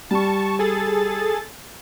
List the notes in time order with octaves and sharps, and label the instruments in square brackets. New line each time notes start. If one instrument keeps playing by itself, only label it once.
[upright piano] G3 [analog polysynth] A5 C#6
[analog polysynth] G#4 A4 A6